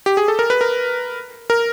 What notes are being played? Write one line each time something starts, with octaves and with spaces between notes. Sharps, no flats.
G4
G#4
A4
A#4
B4
A#4
A#4